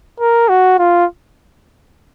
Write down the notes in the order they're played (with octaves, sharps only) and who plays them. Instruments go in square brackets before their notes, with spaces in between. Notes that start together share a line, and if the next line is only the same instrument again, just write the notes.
[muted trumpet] A#4
F#4
F4